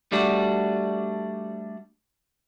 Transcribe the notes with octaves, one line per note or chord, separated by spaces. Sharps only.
G3 A3 D4 F#4